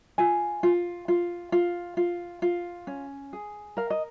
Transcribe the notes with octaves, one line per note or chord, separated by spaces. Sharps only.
F4 G#5
F4
F4
F4
F4
F4
C#4
G#4
A#4 F5
D#5